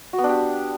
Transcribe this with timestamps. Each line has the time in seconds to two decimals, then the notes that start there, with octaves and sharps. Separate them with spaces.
0.13 F#4
0.18 B3
0.24 D4
0.29 G4